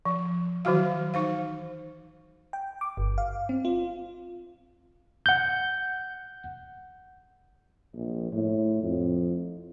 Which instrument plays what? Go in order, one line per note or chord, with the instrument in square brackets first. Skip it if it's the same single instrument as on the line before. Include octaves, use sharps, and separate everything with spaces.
[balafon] F3
D#3 E3 F#3 F#4 F5
D#4 C5 F5
[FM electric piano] G5
D6
G1
F5
C4
F4
[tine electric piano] F#5 G6
[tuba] A#1
A2
F2